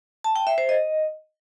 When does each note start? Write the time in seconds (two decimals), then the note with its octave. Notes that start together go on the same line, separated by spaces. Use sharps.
0.24 A5
0.36 G5
0.47 E5
0.58 C5
0.69 D#5